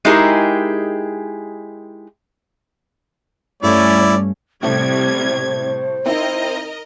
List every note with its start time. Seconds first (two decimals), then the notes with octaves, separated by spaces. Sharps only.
0.05 G#3 D#4 E4 G4 G#4 A#4
3.63 G2 A3 C#4 E4 D5
4.63 A2 C3 G3 A3 C5 G#6
6.06 C4 D#4 E4 A#4 D#5